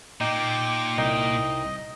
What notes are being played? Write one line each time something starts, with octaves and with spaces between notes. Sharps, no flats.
A#2 A#3 D#4 G5 D6
C2 D#4 D#5 G5